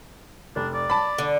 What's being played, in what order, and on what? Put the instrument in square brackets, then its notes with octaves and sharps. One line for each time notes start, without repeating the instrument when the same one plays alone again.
[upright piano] F1 [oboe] D4
[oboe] D5
[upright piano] A5 B5
[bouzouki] D3